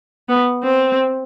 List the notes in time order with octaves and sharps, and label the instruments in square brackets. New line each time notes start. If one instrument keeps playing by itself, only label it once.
[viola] B3
C4